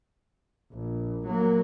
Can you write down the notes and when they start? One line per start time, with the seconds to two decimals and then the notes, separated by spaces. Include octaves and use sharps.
0.73 A#1
1.26 F#3 A#3